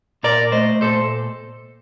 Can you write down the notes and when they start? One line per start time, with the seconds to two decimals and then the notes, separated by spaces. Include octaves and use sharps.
0.23 A#2 A#4 D5
0.52 A3 C5 D#5
0.81 A#2 A4 C5